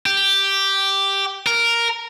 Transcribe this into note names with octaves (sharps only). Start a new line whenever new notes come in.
G4
A#4